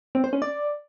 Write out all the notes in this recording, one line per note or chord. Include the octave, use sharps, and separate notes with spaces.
C4
C5
C#4
D5